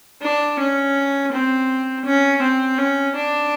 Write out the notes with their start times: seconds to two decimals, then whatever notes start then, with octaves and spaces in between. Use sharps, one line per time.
0.22 D4
0.59 C#4
1.32 C4
2.05 C#4
2.42 C4
2.78 C#4
3.16 D4